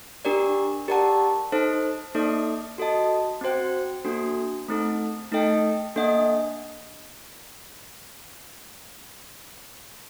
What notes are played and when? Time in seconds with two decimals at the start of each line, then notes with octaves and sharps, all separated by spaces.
0.25 D4 G4 A#4 D5
0.88 G4 A#4 D5 F#5 A5
1.52 D#4 A4 C5
2.15 A#3 D#4 A4 D5
2.78 F#4 A4 D#5 A5
3.41 C4 F#4 C5 G5
4.05 A#3 D4 F#4 A4
4.68 A3 C4 D#4 A4
5.32 A3 D#4 A4 D#5 G5
5.96 A#3 D4 A4 D#5 F#5